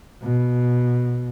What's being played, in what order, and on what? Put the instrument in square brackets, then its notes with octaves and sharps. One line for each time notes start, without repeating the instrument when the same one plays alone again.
[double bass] B2